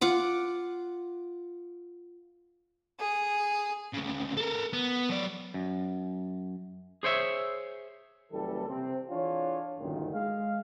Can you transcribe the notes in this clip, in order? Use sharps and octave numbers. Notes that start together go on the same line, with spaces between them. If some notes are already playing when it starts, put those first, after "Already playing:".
F4 F#5 D6
G#4
D2 C#3
A4 A#4
B3
F#3 D5
F#2
G#4 C5 C#5 E5
F#1 E3 G3 A4
C3 C4
E3 D4 F4 G#4 A4 C#5
G1 C#2 F#2 A#2 D#3
G#3 F5